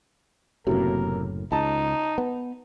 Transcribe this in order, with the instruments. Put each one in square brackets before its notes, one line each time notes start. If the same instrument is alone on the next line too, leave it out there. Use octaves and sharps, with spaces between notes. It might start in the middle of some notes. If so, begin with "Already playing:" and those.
[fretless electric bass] F#1 F#2 A2 [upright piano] C3 F#3 A#3 [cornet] A#4
[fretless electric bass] C#2 [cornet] D#4 [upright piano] A5
[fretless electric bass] B3